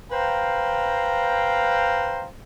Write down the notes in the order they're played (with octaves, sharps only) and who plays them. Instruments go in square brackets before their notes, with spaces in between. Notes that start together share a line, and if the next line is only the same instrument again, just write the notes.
[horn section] B4 C5 F5 G5 A#5